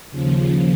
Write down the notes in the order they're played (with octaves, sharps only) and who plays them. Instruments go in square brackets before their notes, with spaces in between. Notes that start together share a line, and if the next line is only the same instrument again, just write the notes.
[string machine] D#2 C#3 F3